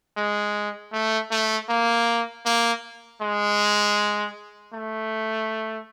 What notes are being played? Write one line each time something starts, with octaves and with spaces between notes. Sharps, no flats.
G#3
A3
A3
A#3
A#3
G#3
A3